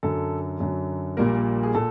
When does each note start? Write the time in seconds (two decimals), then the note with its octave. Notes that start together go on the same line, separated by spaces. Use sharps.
0.03 F#2 D3 F#3 A4
0.60 F#2 D3 F#3
1.17 A#1 A#2 G3 A#3 A#4
1.63 G#4
1.75 A#2 A4